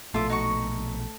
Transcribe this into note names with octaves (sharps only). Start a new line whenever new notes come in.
A#1 B2 A3 F4 E5 D6
D#4 F#4 C#6